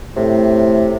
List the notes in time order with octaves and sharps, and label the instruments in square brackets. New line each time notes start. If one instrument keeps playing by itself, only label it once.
[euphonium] A2 [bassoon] C3